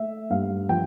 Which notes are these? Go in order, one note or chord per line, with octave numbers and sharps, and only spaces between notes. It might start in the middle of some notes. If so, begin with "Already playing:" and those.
Already playing: A3 E5
G2 F5
F3 G5